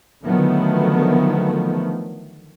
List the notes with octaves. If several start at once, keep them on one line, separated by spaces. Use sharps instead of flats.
D3 D#3 F3 F#3 A3 B3